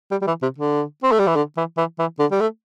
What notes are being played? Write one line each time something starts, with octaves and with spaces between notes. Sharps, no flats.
G3
G3
E3
C3
D3
C4
A3
G3
E3
D3
E3
E3
E3
D3
G3
A3